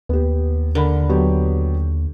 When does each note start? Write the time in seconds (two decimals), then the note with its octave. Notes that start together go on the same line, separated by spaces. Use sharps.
0.09 D#2 B3 G4
0.75 D3 A#4 B5
1.09 F#3 B3 G4